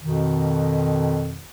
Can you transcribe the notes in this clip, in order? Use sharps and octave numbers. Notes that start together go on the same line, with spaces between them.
F2 B2 D#3